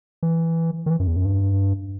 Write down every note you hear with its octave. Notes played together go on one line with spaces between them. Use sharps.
E3
D#3
E3
F#2
E2
F#2
G2